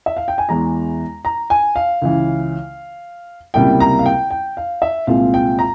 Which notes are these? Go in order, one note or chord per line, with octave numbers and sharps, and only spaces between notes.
E5
F5
G5
G#5
E2 E3 G#3 E4 A#5
A#5
G#5
F5
C#2 C#3 E3
C#2 C3 G3 A#3 E4 G5
A#5
F5
G5
G5
F5
E5
C2 A#2 G#3 C4 F4 F5
G5
A#5